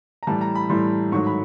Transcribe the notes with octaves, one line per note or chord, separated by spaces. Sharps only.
A#5
A2 E3 G3 A5
A#5
B5
A2 E3 G3 C6
G#2 D#3 F#3 A3 C#6
B5